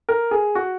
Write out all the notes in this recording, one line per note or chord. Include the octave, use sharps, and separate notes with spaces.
A#4
G#4
F#4